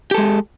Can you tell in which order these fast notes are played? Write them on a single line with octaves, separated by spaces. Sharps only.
G4 A4 G#3